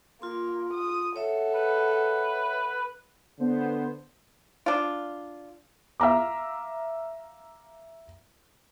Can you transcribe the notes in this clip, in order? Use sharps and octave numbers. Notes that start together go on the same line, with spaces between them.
A#3 F4 C6
D#6
A4 C#5 E5 F#5
B4
D3 B3 C5
D4 F4
E5 F5 A#5 D6